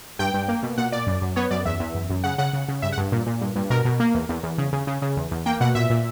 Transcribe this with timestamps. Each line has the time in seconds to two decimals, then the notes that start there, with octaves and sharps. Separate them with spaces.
0.19 G2 G5
0.34 G2
0.48 A#3
0.63 B2
0.78 A#2 F#5
0.92 A#2 D5
1.07 F#2
1.22 F#2
1.36 B3 C#5
1.51 F#2 D5
1.65 E2 E5
1.80 E2
1.95 F#2
2.10 F#2
2.24 C#3 F#5
2.38 C#3 F#5
2.53 C#3
2.68 C#3
2.82 G2 E5
2.92 F#5
2.97 G2
3.12 A#2
3.26 A#2
3.41 G2
3.56 G2
3.70 B2 A#4
3.85 B2
4.00 A#3
4.14 E2
4.29 E2
4.43 E2
4.58 C#3
4.73 C#3
4.87 C#3
5.02 C#3
5.16 E2
5.31 E2
5.46 A#3 G5
5.60 B2 F#5
5.75 A#2 E5
5.90 A#2